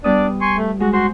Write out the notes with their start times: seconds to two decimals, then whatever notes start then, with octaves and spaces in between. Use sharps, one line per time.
0.04 G3 B3 D4 D5 D#6
0.41 G#5 C6 C#6
0.57 A3
0.80 G#3 F#4
0.93 F#4 C5 C6